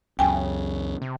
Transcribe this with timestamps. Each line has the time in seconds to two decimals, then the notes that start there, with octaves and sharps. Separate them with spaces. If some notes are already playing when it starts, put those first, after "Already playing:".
0.19 C#2 F#2 C#3 G5 G#5
1.02 C3